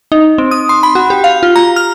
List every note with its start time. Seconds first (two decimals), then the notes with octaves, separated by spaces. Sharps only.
0.12 D#4
0.38 C4
0.51 D#6
0.69 C6
0.83 B5
0.95 F#4
1.10 G4
1.24 F5
1.43 F4
1.56 A#5
1.76 F6